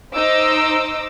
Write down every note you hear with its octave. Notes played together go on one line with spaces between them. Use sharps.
D#4 C5 D#5 D6 E6